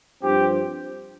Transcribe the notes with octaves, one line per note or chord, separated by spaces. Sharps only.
G2 F3 C4 G4